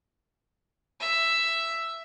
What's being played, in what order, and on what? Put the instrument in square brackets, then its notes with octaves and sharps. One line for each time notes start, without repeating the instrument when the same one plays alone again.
[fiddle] E5